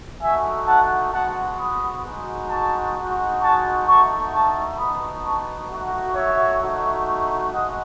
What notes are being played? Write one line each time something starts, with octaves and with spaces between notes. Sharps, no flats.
A3 D#4 F#4 E5 G#5
F#5 A5
G#3 B3 F#4 F#5 A5
B5 D#6
G#3 D#4 F#4
A5 C#6
G#3 D#4 F#4
A5 C#6
A3 D#4 F#4 A5 C#6
A5 C#6
B3 D#4 F#4 B5 D#6
A5 C#6
A3 D#4 F#4
C#5 E5
A3 D#4 F#4
G#3 D#4 F#4 D#5 F#5